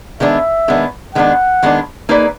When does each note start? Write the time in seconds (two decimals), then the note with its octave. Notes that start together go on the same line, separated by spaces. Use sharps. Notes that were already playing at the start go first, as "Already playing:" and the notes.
0.20 D#3 G#3 B3 D4 E5
0.68 D#3 G#3 B3 D4
1.15 D#3 G#3 B3 D4 F#5
1.63 D#3 G#3 B3 D4
2.09 A#3 D#4 G#4 B4 D5